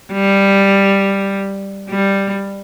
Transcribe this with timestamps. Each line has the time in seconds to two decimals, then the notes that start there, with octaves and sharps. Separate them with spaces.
0.12 G3
1.89 G3